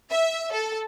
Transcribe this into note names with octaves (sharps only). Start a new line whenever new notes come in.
E5
A4